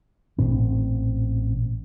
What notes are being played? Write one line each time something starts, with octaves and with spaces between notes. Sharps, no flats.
A1 A#2 C4